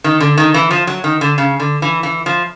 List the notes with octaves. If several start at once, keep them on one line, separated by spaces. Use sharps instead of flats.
D#3
D3
D#3
E3
F3
F#3
D#3
D3
C#3
D3
E3
E3
F3